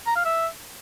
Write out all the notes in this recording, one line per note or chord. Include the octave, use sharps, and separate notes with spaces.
A#5
F5
E5